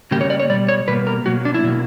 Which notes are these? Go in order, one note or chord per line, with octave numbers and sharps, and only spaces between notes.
C#3 G3 A#3 G4
C#5
D5
C#5
B2 G3 D5
C#5
B2 G3 A#3 B4
A#4
B2 F#3 A#3 F#4
D4
E4
B2 F#3 A#3